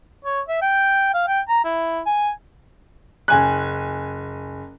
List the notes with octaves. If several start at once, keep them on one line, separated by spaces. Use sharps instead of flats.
C#5
E5
G5
F5
G5
A#5
E4
G#5
F#1 G#5 F#6